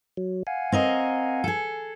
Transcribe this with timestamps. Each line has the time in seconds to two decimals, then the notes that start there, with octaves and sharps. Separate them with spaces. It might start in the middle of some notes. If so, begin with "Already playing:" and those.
0.17 F#3
0.47 F5 F#5 G#5
0.72 C4 A#4 D#5
1.44 G#4 A4